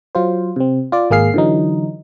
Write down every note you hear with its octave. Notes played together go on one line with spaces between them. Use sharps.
F#3 F4 C5
C3 C4
F4 D5
G#1 A#3 G#4 F5 C7
D3 E3 F#3 D#4